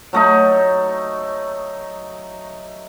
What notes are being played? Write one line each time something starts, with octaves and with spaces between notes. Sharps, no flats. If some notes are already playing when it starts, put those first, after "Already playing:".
F#3 A3 D#4